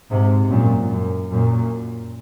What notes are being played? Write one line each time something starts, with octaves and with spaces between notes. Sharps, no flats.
G#2 C3
F#2 A#2
F#2
F#2 A#2